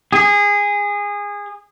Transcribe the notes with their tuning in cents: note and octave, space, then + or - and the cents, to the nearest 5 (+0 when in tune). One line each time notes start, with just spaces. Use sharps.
G#4 -20